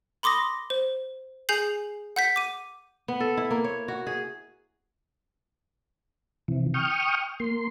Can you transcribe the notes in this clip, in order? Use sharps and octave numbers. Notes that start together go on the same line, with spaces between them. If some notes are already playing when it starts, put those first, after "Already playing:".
B5 C6 D6 D#6 A#6
C5
G#4 G#5 G6 C7 F#7
F#5 G6 B6
D6 D#7
B3
A4
E4
A#3
C#5
F#4
G#4
C3 E3
G5 C#6 D#6 F6
A#3 C6